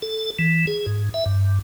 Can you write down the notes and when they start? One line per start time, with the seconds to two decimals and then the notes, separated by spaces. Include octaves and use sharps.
0.02 A4
0.39 E3
0.67 G#4
0.86 G#2
1.14 E5
1.26 G2